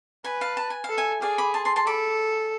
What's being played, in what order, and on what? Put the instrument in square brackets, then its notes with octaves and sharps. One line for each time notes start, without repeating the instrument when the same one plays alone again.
[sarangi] B4 [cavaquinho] G#5 B5
[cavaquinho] F5 A5
A5
G#5
F5
[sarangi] A4
[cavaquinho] E5 G#5
[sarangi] G#4 [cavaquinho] D5 F5
[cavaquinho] B5 D6
A5 C6
A5 C6
A5 C6
[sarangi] A4 [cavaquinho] B5 D6